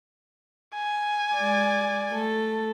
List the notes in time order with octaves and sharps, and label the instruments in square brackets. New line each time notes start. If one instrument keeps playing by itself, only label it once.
[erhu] G#5
[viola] G#3 D5
A3 A4